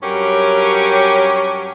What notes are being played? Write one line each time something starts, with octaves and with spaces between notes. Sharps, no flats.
G2 F#3 C#4 G4 A#4